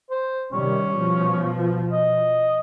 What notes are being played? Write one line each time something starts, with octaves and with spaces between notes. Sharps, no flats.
C5
C3 D#3 G3 C#4
B2 F3
D#5